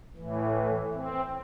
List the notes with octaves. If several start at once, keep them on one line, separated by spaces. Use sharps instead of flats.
A2 E3
C4